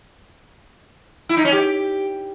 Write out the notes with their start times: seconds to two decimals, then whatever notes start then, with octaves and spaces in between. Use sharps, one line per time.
1.29 E4
1.37 D#4
1.45 C#4
1.52 G4